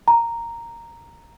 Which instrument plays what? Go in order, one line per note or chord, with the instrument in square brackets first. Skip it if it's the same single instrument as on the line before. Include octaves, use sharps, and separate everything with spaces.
[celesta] A#5